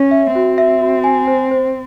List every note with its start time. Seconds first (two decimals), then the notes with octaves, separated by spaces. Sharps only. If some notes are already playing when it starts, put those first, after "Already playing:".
Already playing: C#4 C#5
0.11 E5
0.34 C4 F#4
0.58 E5
0.82 F#4
1.04 G#5
1.27 C5
1.51 C5